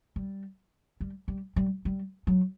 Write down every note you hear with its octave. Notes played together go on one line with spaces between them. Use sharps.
G3
G3
G3
G3
G3
F#3